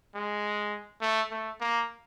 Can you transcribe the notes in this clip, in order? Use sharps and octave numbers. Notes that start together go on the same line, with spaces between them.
G#3
A3
A3
A#3